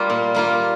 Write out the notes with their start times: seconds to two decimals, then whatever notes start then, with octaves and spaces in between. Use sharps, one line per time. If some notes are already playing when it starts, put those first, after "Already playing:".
Already playing: G3 A#3 F4
0.10 A#2
0.35 G3 A#3 F4